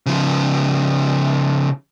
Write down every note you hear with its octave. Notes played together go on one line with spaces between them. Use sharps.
C#3 F3